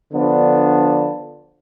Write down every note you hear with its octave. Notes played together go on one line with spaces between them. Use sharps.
D3 F3 B3 D4